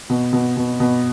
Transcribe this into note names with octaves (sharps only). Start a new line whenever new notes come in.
B2
B2
B2
B2